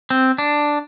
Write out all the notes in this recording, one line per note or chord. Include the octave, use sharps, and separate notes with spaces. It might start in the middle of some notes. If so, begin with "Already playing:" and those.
C4
D4